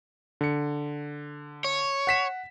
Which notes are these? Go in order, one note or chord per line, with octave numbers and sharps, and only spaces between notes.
D3 C#7
C#5
F#5 B6 E7